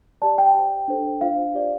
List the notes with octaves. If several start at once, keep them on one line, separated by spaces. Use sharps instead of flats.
G4 D5 A5
G5
G4 C5
D4 A4 C5
D4 F4 C5 F5
G4 D5